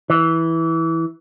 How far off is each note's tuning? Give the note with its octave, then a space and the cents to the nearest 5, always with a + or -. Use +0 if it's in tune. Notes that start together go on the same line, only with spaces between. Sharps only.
E3 -10